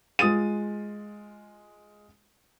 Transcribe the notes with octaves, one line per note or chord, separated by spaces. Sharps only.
G#3 F4 D#6 A6 D#7